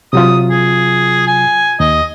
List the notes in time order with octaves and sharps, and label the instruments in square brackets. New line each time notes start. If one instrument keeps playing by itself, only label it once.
[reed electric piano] C3 F#3 F4 [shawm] D#6
[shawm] G#4
G#5
[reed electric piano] D#2 [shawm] D#5